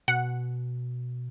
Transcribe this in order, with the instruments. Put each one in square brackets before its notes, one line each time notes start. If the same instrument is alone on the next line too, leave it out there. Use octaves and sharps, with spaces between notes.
[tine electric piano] B2 [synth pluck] F#5